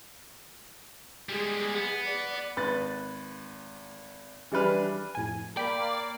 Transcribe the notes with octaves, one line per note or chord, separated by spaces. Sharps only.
G3 G#3 G#4
B3
D5
G#1 B4 F#6 A6
E3 G3 D4 B4 F6
F2 A2 G#5
A#3 D5 G5 B5